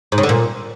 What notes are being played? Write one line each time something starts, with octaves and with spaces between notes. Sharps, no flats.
G#2
C#3
D3
A#2